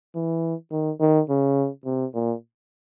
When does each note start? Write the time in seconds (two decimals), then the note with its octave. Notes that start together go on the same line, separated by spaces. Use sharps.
0.15 E3
0.71 D#3
1.00 D#3
1.29 C#3
1.85 C3
2.14 A#2